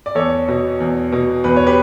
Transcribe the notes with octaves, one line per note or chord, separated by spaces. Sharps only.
D5
E2 A4 C#5
B2
E2
B2
E2 B4
C#5
G4 B4